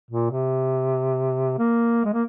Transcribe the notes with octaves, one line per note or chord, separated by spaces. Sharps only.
A#2
C3
A#3
G#3
A#3